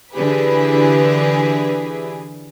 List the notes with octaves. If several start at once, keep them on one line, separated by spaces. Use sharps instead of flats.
D3 E3 E4 G4 G#4 B4